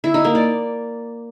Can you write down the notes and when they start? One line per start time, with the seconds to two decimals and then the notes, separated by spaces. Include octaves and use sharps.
0.04 E4
0.14 D#4
0.25 A#3
0.35 D5